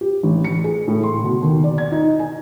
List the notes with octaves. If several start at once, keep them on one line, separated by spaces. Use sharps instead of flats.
G4
A1
C#7
G#4
A2
C6
B2
D#2
D5
G#6
D#4
G#5